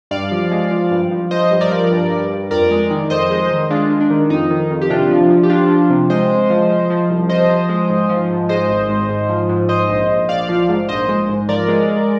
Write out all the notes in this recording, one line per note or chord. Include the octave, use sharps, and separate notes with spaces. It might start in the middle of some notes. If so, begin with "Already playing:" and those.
G2 D5 F5
F3
G#3
F3
G2
F3
F3 C5 D#5
G2
A#4 D5
F3
G2
G2
G2
F2 A#4 D5
G#3
D#3
F2 C5 D#5
G#3
D#3
G#3 D4 F4
G#3
D4
D#3
F2 D#4
D#3
F2
G4
C3 D4 F4
F3
F3
G4
F3 D4 F4
F3
C3
G#3 C5 D#5
G#3
F3
F3
F3
C2
F3 C5 D#5
F3
G#3
G#2
F3
G#2
G#3 C5 D#5
G#1
G#2
G#2
F3
G#2
G#2 C5 D#5
A#1
A#1
A#1 D5 F5
F3
G#2
A#1 C5 D#5
G#3
G#2
F3 A#4 D5
G#3
G#3